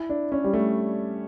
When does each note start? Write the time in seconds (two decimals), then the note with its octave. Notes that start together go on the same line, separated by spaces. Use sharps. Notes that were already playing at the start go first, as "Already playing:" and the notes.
Already playing: E4
0.10 D4
0.32 C#4
0.44 G3
0.54 A3